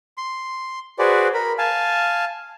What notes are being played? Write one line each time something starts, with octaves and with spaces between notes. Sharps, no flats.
C6
F#4 G#4 B4 C5 D5
A#4 B5
F5 G#5 A5